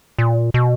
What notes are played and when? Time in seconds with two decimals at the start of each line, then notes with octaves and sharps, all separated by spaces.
0.18 A#2
0.54 B2